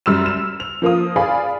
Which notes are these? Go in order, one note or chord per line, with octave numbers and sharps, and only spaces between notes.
F#2 G3 E6 F6 E7
E7
F7
F3 A#3 F4 D#6
G#4 D5 F5 G#5 B5